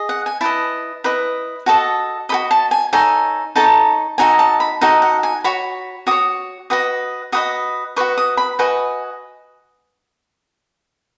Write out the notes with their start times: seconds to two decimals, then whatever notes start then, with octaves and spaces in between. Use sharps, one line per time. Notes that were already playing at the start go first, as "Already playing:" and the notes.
Already playing: G#4 D#5
0.09 F#5
0.26 G#5
0.41 E4 B4 D#5 A5
1.04 E4 B4 D#5
1.66 F#4 A4 D#5 A5
2.29 F#4 A4 D#5 B5
2.51 A5
2.71 G#5
2.93 D#4 A4 C#5 G#5
3.56 D#4 A4 C#5 A5
4.18 D#4 F#4 A4 D#5 G#5
4.39 A5
4.60 B5
4.81 D#4 F#4 A4 D#5 A5
5.02 F#5
5.23 G#5
5.44 F#4 C#5 B5
6.07 F#4 C#5 D#6
6.70 F#4 B4 D#5 D#6
7.32 F#4 B4 D#5 D#6
7.96 F#4 B4 D#5 C#6
8.17 D#6
8.37 B5
8.59 F#4 B4 D#5 G#5